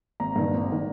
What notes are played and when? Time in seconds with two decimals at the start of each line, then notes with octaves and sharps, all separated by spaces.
0.20 G#1 A#5
0.36 G2 D#3
0.53 G#1
0.72 D#3